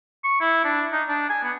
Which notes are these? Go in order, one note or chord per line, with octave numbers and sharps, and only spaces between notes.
C#6
E4
D4
D#4
D4
G#5
B3